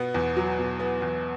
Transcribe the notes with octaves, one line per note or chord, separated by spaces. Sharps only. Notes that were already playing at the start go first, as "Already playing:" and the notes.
Already playing: B2 B3
E2
F#3
B2
B3
E2